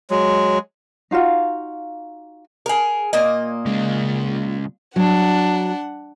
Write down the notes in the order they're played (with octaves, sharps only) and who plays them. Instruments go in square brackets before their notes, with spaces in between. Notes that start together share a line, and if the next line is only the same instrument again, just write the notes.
[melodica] F#3 G#3
[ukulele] D#4 F4 F#4 F5
[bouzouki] G#4 A#4
A#2 A#3 D#5
[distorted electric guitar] C#3 G#3
[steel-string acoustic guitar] F#3 [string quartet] D4 F#5